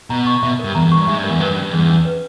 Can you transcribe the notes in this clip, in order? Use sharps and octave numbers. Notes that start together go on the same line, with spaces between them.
B2 A#5
C#6
B2 E5
A#4
G2
E2 A#5
E2
C#6
G2
G#2 E5
G2
A#4
E2
G2 B4
G2
C#4
G2
E2 G#4
C#4
B4